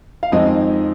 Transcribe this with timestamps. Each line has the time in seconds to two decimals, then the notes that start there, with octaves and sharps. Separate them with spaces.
0.23 F5
0.32 F2 D#3 G#3 C4 D#4 D#5